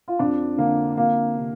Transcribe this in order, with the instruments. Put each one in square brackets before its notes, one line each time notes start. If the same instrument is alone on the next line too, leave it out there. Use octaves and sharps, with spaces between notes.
[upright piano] F4
F2 D4
D3 A#3
F2 A#3
C3